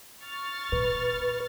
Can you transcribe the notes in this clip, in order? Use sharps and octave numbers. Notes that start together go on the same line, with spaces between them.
C#6 F6 A6
A#2 B4